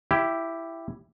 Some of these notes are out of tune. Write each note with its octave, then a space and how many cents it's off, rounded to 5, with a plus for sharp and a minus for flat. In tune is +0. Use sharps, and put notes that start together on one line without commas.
E4 +10 G4 +0